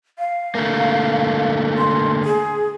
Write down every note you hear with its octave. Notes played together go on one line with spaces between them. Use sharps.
F5
D3 A3 A#3
C6
G#4